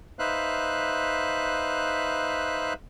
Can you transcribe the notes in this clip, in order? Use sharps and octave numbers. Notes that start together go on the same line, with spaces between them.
D#4 B4 C5 E5 F5 F#6